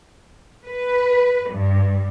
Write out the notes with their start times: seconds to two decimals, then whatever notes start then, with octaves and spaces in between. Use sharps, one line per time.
0.67 B4
1.51 G2